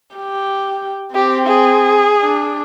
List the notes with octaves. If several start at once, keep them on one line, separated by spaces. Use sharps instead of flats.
G4
C4 G4
G#4
D4